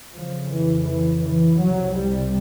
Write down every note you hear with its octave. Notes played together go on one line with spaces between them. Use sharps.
F2 C#3 F3
E3
E3
E3
C2 C3 F#3
G3